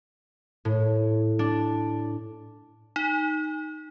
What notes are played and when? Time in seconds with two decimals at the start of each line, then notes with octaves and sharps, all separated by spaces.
0.65 A2
1.39 D4
2.96 D#4